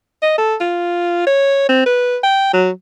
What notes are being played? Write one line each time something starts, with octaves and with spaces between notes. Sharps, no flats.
D#5
A4
F4
C#5
C4
B4
G5
F#3